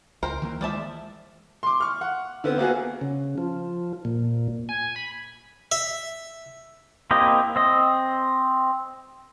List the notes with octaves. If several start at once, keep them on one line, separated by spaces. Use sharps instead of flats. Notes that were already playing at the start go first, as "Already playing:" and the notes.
C#2 A#4 C5 G5
D#3 E3 A#3
F3 G#3 D5 E5 A5
C6 D6
C#6 F6
F#5
D3 B3 C4
A#3 B3 F#4 G#4
C#3
F3
A#2
G#5
B5
E5
A#3 C4 E4 G4 D#5
C4 D#5